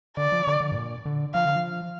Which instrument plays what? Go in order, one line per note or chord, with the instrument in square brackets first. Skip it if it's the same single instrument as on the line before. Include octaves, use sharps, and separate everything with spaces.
[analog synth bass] D3 [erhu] D5
[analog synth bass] F3
D3
D3
G2
A#2
D3
[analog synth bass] F3 [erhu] F5
[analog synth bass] D3
F3